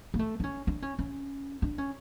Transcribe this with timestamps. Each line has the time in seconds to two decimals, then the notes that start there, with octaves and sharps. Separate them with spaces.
0.14 A#3
0.19 A3
0.40 D4
0.44 C#4
0.67 D4
0.82 C#4
0.99 C#4
1.62 D4
1.78 C#4